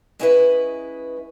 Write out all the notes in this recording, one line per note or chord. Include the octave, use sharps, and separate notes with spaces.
G#3 C#4 E4 B4 D#5